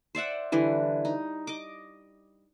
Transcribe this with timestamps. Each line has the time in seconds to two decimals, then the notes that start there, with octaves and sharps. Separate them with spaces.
0.15 C5 D5 E5 F#5
0.52 D3 E3 G3
1.05 D#4
1.47 D#5 D6